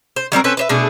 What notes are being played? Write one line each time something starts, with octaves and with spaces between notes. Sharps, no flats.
C5
F#3 G3 C4 A#4
C4 C#4 A4 B4
B4 C5 E5
B2 A3 D4 G#4